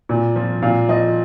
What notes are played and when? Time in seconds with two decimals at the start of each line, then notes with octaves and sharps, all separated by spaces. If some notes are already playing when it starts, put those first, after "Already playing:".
0.09 A#2
0.36 F3
0.62 A#2 F5
0.89 F3 D#5